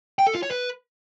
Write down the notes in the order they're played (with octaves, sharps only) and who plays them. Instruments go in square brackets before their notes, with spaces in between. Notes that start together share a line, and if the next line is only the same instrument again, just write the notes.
[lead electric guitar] G5
A4
F4
C#5
B4